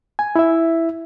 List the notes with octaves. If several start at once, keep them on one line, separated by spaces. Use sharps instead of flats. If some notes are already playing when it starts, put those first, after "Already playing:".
G#5
E4 E5